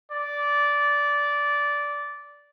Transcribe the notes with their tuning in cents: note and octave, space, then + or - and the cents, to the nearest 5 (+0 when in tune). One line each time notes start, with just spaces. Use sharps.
D5 -15